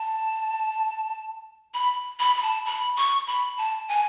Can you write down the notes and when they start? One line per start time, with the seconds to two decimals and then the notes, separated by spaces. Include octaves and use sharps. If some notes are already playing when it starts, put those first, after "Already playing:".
Already playing: A5
1.74 B5
2.19 B5
2.36 B5
2.42 A5
2.66 B5
2.97 C#6
3.27 B5
3.58 A5
3.88 G#5